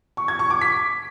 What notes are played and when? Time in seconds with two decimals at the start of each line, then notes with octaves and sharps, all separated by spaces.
0.17 C#6
0.28 G#6
0.39 C#6
0.50 D6
0.61 B6